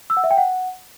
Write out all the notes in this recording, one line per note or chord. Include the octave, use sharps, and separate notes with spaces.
E6
F#5
E5
G5
F#5